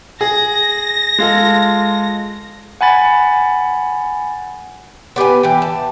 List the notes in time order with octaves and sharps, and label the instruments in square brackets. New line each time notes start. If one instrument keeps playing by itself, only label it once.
[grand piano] G#4 [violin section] A#6
[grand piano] G#3 F4 A4
[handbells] F#5 G#5 B5 A6
[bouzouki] B3 G4 B4 G#5
E3 G4
A5